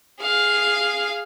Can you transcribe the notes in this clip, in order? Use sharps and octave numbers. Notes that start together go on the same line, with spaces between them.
G#4 F5